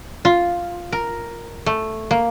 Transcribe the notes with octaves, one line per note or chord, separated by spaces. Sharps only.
F4
A#4
A3
A#3